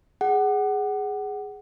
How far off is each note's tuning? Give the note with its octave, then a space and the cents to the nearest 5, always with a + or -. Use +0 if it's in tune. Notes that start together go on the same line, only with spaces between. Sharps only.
G#4 +0 F#5 +20